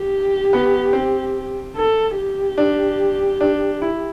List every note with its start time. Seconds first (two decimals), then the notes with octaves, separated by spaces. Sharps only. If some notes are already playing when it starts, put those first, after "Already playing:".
Already playing: G4
0.53 B3
0.93 C4
1.76 A4
2.17 G4
2.58 D4
3.41 D4
3.82 E4